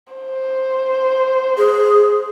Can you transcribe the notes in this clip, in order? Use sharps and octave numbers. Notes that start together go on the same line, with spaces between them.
C5
G#4